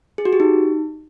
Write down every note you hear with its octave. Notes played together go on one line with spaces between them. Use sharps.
G#4
F#4
G4
D#4